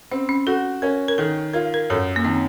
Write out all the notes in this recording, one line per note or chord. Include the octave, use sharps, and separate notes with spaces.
C4 C#4
C#4
F#4 A4
C#4 A#4
A#4
D#3 A4
F4 A#4
A#4
F#2 A4
A#3
D#3 C4